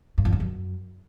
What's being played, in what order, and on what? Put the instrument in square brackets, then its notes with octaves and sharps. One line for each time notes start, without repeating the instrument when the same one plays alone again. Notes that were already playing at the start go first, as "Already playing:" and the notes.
[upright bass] G2
F2
G2
F#2